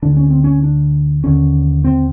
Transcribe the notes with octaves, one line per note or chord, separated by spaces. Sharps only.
D2 D3 D4
C#4
C4
C#4
D4
D#2 D3 C#4
C4